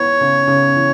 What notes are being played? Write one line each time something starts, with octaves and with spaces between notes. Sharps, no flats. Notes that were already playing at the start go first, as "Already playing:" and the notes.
Already playing: E3 B3 C#5
C#3
C#3
E3